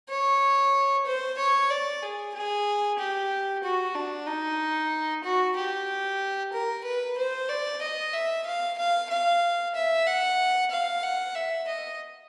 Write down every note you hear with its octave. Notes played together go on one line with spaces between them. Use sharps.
C#5
C5
C#5
D5
G#4
G#4
G4
F#4
D4
D#4
F#4
G4
A#4
B4
C5
D5
D#5
E5
F5
F5
F5
E5
F#5
F5
F#5
E5
D#5